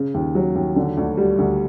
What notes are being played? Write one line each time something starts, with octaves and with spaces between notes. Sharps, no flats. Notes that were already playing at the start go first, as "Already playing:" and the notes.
Already playing: C#3
D#2
F#3
D#2
D3
D2
G3
D2